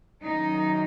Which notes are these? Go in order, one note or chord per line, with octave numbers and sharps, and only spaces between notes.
F#2 D#3 F#3 D#4